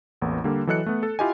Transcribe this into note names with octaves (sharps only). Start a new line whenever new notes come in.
A1 E2 A#3
D3 G3 A#3
E3 F#3 A4 D#5 F#6 C#7
A3 B3
A4
E4 F4 G4 D#5 G#5